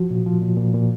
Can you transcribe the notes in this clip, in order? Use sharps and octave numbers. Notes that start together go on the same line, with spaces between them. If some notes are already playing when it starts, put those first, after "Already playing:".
Already playing: F3 F#4
A#2
F3
A#2
A#2
A#2